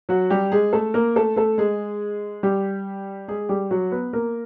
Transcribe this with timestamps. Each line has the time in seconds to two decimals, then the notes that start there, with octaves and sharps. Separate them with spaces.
0.09 F#3 F#4
0.30 G3 G4
0.52 G#3 G#4
0.73 A3 A4
0.94 A#3 A#4
1.16 A3 A4
1.36 A3 A4
1.58 G#3 G#4
2.43 G3 G4
3.28 G#3 G#4
3.49 G3 G4
3.71 F#3 F#4
3.92 B3 B4
4.13 A#3 A#4